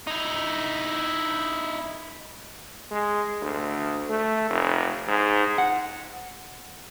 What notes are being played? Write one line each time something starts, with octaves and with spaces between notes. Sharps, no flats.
D#4 E4
G#3
D2
A3
F1
G#2
F#5